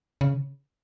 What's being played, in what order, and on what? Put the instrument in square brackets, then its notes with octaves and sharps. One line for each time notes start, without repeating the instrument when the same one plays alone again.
[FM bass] C#3